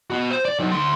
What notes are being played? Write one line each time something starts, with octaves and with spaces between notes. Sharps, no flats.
B3 F#4
C5
D5
F#3 D#4
D2 C6